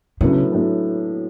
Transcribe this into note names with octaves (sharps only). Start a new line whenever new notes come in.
A2 C#3 F#3 B3 D4
A2 F#3 B3 D4